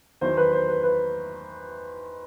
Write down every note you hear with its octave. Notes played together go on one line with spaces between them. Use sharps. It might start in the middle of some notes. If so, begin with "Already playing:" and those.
E2 D#3 F#3 C5
B4
C5
B4
B4